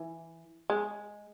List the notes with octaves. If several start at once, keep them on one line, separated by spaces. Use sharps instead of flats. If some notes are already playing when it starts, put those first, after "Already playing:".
Already playing: E3
G#3